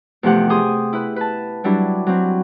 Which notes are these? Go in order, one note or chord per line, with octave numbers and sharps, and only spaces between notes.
E2 C3 F3 A3 G4 F#5
G4 G#4 C6 D#6
E4 B4
B4 A5
F#3 G3 D4 E4
F#3 C4